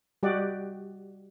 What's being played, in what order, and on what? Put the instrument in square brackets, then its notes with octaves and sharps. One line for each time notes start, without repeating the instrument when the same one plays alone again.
[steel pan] G3 F#4 G4 D5 D#5 F#5